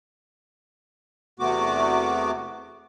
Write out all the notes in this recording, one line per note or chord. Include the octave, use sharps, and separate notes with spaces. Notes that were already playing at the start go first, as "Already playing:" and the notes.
E2 C3 A3 B3 F#4 D6